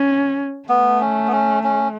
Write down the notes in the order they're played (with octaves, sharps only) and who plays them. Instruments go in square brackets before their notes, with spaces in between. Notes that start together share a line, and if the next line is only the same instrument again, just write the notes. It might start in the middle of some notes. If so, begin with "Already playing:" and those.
Already playing: [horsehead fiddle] C#4
[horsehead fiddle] A3 [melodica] B3
[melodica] C#4
B3
C#4
C#4